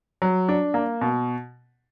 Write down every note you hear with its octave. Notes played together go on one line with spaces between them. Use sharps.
F#3
D4
A#3
B2